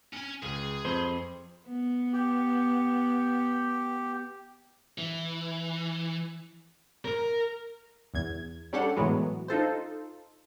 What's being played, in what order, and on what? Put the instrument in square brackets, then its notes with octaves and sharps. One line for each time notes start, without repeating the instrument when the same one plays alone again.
[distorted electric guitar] C#4 G#5
[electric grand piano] C#2 [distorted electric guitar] G#4
[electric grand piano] F2 [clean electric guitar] C5
[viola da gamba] B3
[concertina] G4
[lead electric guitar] E3
[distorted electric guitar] A#4
[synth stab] E2 G#6
G3 C#4 D4 G4 A4 F#5
A2 E3 F#3 G#3 B3
D#4 F4 A4 C5